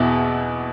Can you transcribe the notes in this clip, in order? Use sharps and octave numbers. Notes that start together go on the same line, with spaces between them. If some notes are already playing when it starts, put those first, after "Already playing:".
Already playing: E2 B2 B3 E4